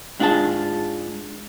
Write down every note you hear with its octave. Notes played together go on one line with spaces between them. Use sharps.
G#2 D4 F4 G4 G#4 A5